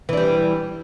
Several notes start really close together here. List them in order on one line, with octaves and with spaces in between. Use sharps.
E3 D4 G3